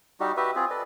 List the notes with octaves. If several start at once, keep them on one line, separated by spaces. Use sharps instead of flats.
G3 D#4 F#4 G4
F#4 G4 B4 E5
C4 F4 G#4
A4 B4 D5 D#5